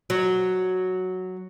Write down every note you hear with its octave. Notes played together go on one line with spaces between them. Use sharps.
F#3